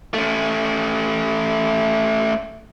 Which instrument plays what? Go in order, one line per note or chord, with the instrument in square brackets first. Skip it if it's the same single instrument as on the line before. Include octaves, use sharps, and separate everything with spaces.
[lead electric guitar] A3 C#4